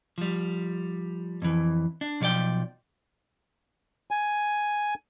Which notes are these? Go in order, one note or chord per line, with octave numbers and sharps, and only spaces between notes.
F3 G3
F2 E3
D4
B1 F3 F#4 D5 G5
G#5